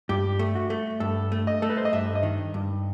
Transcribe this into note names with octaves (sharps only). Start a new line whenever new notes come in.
G2 G4
A3
F#4
A3
G2 A4
A3
D#5
A3 A4
B4
C5
D#5
G2 E5
D#5
D#3
G2